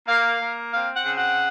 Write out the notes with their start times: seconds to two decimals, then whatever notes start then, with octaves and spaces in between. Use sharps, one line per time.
0.07 A#3 F5
0.40 A#3
0.73 C4 F5
0.95 F#5
1.06 C#3
1.17 F#5